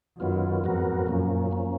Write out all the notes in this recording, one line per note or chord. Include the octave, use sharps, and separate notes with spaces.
F#2 D#3 F#3 B3 F4
F2 G#2 F#3 B3 F#4 A#4
F#2 A#2 F3 A#3 C#4
F3 A#3 C#4